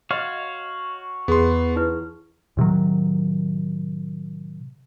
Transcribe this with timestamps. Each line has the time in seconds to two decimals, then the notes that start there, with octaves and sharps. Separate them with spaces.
0.11 F#4 C#5 D#5 F5 C6
1.28 E2 B3 G#4 C6
1.76 D#4 E4 B4
2.57 A2 C3 D#3 F#3